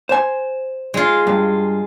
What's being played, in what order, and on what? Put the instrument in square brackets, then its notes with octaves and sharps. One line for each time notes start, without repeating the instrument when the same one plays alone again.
[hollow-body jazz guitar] C5 G#5
[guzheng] G#3 F4
[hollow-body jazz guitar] G2